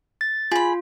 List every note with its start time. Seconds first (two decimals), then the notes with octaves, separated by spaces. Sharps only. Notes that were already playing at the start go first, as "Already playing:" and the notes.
0.21 A6
0.52 F4 G#4 B5